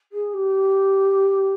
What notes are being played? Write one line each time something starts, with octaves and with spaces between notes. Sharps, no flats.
G#4
G4